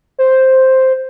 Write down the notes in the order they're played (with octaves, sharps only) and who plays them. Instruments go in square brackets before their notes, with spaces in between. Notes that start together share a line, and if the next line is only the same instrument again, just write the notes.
[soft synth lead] C5